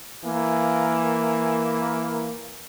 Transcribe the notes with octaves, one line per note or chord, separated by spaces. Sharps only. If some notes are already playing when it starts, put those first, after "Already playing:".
E3 A#3